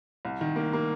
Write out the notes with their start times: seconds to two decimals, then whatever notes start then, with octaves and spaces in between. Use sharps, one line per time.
0.25 C2
0.41 D#3
0.56 A#3
0.73 A#3